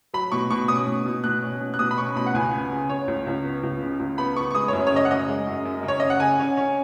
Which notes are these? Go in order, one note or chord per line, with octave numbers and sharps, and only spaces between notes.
F#3 B5
B2 C#6
B2 C#6
C#4 D#6
B2
B2
B2 F#6
C#4
B2
F#6
B2 D#6
B5
C#4 C#6
B2 B5
F#5
C#2 G#5
B3
C#3
C#3 C#5
C#2
C#2
B3
C#2
C#3
C#2
B3 B5
B3 C#6
C#6
G#3 D#6
F#2 C#5
C#5
C#3 D#5
F#5
F#2 D#5
G#3
F#2
F#2
C#3
C#5
C#3 D#5
F#5
C#3 G#5
C#4
C#4